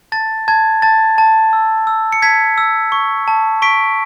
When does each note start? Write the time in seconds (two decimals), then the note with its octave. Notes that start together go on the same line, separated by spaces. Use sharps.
0.12 A5 A6
0.48 A5 G#6
0.82 A5 A6
1.18 A5
1.53 E6
1.87 E6
2.12 C#7
2.22 A5 G#6 B6
2.58 E6
2.92 C#6
3.28 A5
3.62 C#6 B6 D7